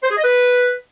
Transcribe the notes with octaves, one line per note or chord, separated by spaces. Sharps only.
C5
G#4
D#5
B4